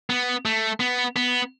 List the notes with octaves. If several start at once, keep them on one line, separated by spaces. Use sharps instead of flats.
B3
A3
B3
B3